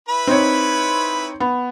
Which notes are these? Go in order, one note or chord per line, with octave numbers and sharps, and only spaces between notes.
E4 B4 B5
C4 D#4 C#5
B3